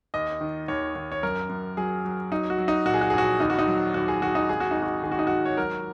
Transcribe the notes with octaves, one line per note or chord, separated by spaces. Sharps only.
D#2 D#5
D#3
D#2 C#5
D#2
C#5
F#2 A#4
F#2
F#3 G#4
F#3
F#3 D#4
F#4
F#3
D#4
A#2 F#4
G#4
F#4
G#4
A#1 F#4
D#2 D#4
F#4
D#4
F#3
D#2 F#4
G#4
D#2 F#4
D#4
G#1 G#4
F#4
G#1 D#4
F#4
D#3 G#4
F#4
D#4
G#1 F#4
C#5
F#3 A#4